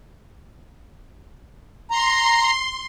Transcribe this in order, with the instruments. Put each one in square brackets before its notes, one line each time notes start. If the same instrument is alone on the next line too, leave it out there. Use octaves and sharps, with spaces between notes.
[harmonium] A#5 [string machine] C6